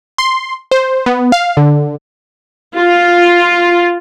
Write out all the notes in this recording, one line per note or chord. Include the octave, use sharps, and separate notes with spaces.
C6
C5
B3
F5
D3
F4